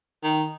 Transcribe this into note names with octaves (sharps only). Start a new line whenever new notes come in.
D#3